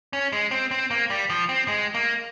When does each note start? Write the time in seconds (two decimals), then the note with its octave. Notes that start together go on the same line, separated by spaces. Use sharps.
0.13 C#4
0.32 G#3
0.51 C4
0.71 C4
0.91 A#3
1.10 G3
1.30 F3
1.49 C4
1.68 G#3
1.94 A#3